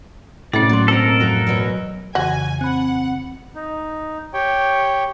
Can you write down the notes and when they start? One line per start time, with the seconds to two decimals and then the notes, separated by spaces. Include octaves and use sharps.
0.53 A2 C3 A3 C#4 D5
0.69 F#3 A#3 C6 A6
0.88 B2 C4 A4 A#4
1.20 F2 F#3 E4
1.47 E2 B2 F#3
2.15 F2 C#3 E3 F#4 G#5
2.61 C4 F#5 B5 F#6
3.55 D#4
4.33 G4 C#5 G5